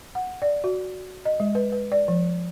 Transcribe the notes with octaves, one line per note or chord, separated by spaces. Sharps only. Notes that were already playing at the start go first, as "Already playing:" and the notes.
F#5
D5
F#4
D#5
G#3
B4
B4
D5
F3